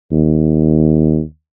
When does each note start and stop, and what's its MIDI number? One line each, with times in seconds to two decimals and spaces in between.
0.12 1.21 39